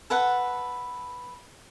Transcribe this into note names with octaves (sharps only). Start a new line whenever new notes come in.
A4 B4 F#5